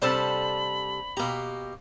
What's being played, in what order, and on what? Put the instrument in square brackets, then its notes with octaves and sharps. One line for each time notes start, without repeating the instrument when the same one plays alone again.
[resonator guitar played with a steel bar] C3 G3 A4 [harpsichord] D4 C5 A5 [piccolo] B5
[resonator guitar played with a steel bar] B2 G4 [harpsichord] A#3 A#5